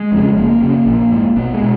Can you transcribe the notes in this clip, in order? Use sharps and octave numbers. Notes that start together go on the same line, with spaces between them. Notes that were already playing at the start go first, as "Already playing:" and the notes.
Already playing: G#3
F2 C#3
F#1 A#3
F#2 C#3
A#1
G#2
B1 B3
G#3
B2